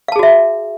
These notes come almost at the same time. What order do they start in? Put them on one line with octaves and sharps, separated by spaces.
F5 A5 G#4 F#4 E5